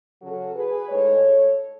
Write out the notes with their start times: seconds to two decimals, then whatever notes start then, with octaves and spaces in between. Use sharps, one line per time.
0.22 C#3 F#3 C#4 F#4 A4
0.55 G#4 B4
0.89 A2 G#3 D#4 A4 C#5